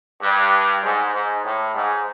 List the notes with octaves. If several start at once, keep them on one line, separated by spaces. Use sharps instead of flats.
G2
G#2
G#2
A2
G#2